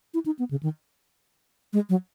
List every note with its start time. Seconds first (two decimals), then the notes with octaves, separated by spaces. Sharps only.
0.14 E4
0.26 D#4
0.39 B3
0.51 C#3
0.63 D#3
1.73 G#3
1.89 F#3